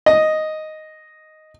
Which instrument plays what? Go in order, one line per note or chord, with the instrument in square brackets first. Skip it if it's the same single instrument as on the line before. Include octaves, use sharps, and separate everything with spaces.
[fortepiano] D#5